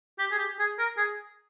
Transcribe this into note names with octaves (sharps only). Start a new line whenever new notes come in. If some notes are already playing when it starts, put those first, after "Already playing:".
G4
G#4
G4
G#4
A#4
G#4